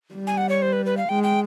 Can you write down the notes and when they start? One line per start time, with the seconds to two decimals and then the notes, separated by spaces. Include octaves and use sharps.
0.15 G3
0.27 G#5
0.37 F#5
0.49 C#5
0.62 C5
0.73 B4
0.86 B4
0.97 F5
1.09 G#3 G5
1.23 G5